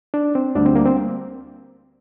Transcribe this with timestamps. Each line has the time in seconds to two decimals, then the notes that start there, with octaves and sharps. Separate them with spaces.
0.14 D4
0.35 C4
0.55 D2 D3 G3 D4
0.66 C4
0.75 A#3
0.86 C4